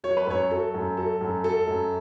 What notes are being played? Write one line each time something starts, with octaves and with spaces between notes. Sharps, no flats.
F#3 C#5
B4
F#2 C#5
F#3 A4
F#2
F#3 A4
F#2
F#3 A4
F#2